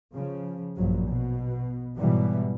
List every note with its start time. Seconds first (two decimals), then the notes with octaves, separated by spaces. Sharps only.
0.14 C#3 F3
0.76 A#1 G2 F#3
1.08 B2
1.98 G#2 B2 E3 F#3 G3